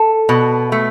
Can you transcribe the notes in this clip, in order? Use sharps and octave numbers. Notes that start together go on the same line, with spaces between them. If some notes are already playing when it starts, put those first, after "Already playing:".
Already playing: A4
B2
A3